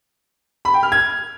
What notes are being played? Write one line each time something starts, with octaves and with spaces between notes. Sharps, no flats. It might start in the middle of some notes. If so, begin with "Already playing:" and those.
B5
G5
F6
G#6